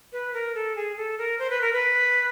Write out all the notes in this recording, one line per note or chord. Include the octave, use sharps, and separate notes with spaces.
B4
A#4
A4
G#4
A4
A#4
C5
B4
A#4
B4